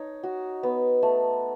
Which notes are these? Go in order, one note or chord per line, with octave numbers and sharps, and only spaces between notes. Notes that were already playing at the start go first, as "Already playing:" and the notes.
Already playing: D#4 C#5
F#4
B3
A3